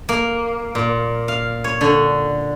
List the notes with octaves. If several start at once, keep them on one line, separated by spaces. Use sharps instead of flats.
A#3
A#2
F5
C#5
D3